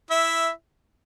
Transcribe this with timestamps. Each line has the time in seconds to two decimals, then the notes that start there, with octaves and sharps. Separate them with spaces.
0.10 E4 E5